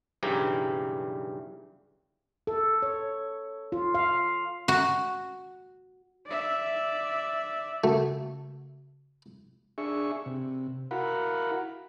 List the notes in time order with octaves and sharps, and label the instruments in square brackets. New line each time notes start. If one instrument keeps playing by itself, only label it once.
[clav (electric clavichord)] B1 G2 C#3 E3 G4 A#5
[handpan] A4
C#5
F4
F5
[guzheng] F#4
[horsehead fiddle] D5 E5
[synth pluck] C#3 F#4 [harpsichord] A3
[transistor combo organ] D4 G#4 E5 C#6
C3
E4 F#4 A#4 F5 F#5 B5